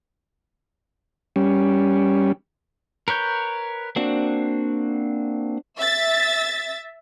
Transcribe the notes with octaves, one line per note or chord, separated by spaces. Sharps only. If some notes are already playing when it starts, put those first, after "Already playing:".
G3 C#4
A#4 B4 C#5 G6
A#3 C4 D4 F#4
E5 A6